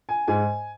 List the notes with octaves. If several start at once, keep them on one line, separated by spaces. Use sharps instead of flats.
G#5
G#2 G#5